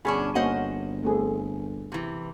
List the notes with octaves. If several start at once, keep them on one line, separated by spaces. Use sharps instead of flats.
G1 B2 C#4 D4 G#4 G#5 B5
A#3 C#4 F#4 C5 D#5 F#5
A3 C4 G#4
C3 E3